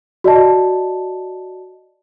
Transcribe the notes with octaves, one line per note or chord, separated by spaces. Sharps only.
F#4 D5 D#5 A5